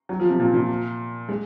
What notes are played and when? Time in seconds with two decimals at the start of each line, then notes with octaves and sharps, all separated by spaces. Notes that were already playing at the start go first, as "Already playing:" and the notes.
0.09 F#3
0.20 F3
0.29 C3
0.40 A#2
0.54 A#2
1.29 G#3